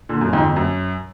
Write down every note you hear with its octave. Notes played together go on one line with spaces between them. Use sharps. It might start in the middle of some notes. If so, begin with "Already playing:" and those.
A#2 D3
F#2 A#2
F2 G#2
F2
F#2